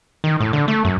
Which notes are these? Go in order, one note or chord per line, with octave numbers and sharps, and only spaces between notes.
D#3
A2
D3
A3
F#2